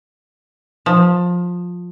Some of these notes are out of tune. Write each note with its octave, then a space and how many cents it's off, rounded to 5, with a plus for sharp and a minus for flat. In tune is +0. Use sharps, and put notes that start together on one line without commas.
F3 +20